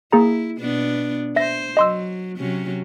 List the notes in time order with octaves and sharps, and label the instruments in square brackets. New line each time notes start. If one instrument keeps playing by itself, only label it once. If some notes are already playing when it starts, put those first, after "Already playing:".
[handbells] A#3 G#4 A#5 [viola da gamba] E4
[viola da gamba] B2 B3 D4
[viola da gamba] C5 [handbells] E5 A#6
[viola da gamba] F#3 [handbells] D#5 C6 E6
[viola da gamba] C3 F#3 C#4